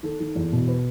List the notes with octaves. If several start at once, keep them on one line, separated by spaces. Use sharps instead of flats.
D#3 A4
D#3
E2
B2
B4